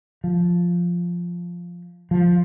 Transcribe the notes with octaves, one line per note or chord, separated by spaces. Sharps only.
F3
F3